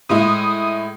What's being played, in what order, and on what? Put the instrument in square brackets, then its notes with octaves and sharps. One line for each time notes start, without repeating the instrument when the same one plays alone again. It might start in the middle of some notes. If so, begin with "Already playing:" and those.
[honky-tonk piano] A2 G#3 E4 [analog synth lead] D#6